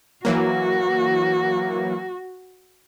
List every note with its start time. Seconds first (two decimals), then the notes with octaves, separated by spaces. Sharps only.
0.25 E3 F#3 A#3 F#4